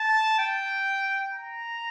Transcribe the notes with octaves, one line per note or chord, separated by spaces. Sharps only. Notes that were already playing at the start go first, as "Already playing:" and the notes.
Already playing: A5
G5
A#5